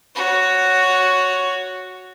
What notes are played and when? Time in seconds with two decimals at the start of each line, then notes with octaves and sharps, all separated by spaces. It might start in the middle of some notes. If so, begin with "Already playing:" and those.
0.15 F#4 C#5